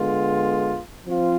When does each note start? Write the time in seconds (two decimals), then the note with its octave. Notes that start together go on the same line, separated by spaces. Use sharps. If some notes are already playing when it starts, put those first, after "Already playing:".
Already playing: D3 G#3 B3 F4
1.05 F3 C4 F4